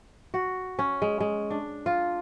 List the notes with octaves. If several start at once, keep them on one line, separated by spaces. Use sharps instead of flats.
F#4
C#4
G#3
G#3
D4
F4